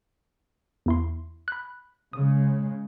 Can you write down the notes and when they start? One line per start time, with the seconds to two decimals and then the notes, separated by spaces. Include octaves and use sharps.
0.86 E2 E4 C6
1.48 B5 F#6
2.13 C#3 G#3 D#6